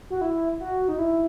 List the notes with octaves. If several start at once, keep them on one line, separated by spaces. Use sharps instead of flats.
F#4
E4
F#4
D#4
E4